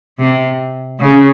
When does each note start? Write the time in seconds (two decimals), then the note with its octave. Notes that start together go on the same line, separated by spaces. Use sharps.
0.19 C3
1.00 C#3